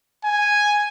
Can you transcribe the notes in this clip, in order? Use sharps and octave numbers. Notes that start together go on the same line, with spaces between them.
G#5